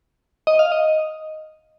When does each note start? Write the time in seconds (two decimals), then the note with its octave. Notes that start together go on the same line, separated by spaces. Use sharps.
0.47 D#5
0.59 F5
0.72 D#5